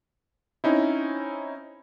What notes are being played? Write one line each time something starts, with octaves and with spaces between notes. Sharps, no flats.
C4 C#4 D#4 E4